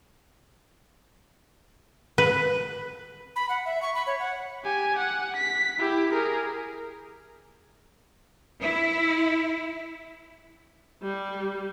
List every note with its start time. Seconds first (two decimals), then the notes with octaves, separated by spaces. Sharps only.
2.18 B4
3.36 B5
3.49 F#5
3.66 E5
3.82 C#6
3.95 B5
4.07 C#5
4.20 F#5
4.64 G4 G#5
4.99 F#5
5.36 B6
5.79 E4 G4
6.13 G#4 A#4
8.62 E4
11.03 G3